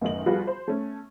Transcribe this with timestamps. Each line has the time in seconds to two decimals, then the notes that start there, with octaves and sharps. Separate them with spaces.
0.01 A1 F#2 D#3 D#4 F#7
0.26 F3 G3 B3 F4 F#4 G#4
0.47 C5
0.68 A3 C#4